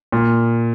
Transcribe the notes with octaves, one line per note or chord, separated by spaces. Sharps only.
A#2